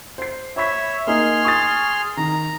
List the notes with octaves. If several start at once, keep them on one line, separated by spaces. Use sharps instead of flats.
C5 C7
C#5 E5 B5 C#6 B6
A#3 D#4 G#4 C6 F6
C#6 D#6 A6
D#3 A#5